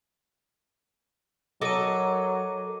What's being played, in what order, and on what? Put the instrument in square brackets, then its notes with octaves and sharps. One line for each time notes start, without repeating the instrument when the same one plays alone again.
[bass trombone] F#3 [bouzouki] A4 A#4 D#5 [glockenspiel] D6 D#7